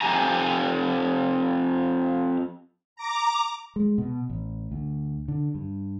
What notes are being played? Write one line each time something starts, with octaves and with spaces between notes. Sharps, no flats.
F2 E3 G4 G#5 A#5
A#5 D6
G#3
B2
A1
D2
D3
G2